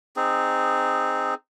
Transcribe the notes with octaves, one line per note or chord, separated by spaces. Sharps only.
C4 D#4 G#4